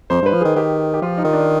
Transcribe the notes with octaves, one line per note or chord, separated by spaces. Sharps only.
F2 C5
G2 B4
F3
G#4
D#3
D#3 G4
G4
F3 F4
D#4
D#3
D4